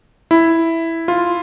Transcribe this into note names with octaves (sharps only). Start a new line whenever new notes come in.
E4
F4